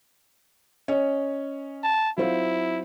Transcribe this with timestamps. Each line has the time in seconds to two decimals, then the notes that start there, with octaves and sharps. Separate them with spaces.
0.88 C#4 C#5 D#5
1.84 A5
2.18 F#3 C4 E4 F4